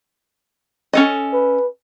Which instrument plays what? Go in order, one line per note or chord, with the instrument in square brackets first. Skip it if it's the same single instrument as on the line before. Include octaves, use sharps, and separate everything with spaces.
[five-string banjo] C#4 A4 D#5
[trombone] B4